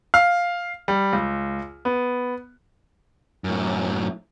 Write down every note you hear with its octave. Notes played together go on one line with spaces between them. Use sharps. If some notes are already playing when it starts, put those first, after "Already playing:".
F5
G3
C#2
B3
F#2 A2